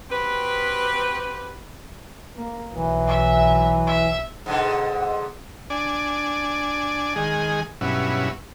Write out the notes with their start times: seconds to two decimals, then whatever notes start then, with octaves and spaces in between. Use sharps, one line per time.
0.10 C4 F#4 G4 B4
2.37 A#3
2.73 B1 E3 F#3
3.07 E5
3.87 E5
4.46 G#2 B2 D3
5.70 D4 D5 G#5
7.16 D#3 G#3 G#4
7.81 G2 B2 F#3 C#4 E4